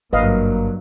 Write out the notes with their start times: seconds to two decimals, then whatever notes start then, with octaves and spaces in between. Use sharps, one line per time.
0.13 G#1 G2 F#3 A#3 B4 D#5 F5